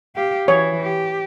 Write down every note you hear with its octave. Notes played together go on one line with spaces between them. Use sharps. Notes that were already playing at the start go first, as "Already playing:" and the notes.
G4 F5
E3 C#5
G4